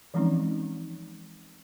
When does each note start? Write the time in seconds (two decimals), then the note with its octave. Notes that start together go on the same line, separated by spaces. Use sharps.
0.14 E3 F3 G#3 C4 C#4 D#4